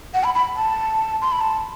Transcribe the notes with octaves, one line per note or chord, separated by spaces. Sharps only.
F#5
B5
B5
A5
C6
B5
A5